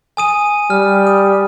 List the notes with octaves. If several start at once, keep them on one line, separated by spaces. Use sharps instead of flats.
G#5 D#6 D#7
G3 F6
D#6